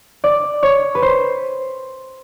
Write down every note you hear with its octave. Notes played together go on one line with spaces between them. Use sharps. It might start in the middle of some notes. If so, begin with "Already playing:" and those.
D5
C#5
B4
C5